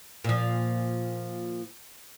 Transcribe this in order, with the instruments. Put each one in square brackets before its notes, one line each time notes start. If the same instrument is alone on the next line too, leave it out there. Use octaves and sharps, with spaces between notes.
[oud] A#2 F3